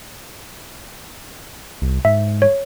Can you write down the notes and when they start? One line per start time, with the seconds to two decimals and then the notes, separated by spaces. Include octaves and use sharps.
1.82 C2
2.05 G#2 E5
2.42 C#5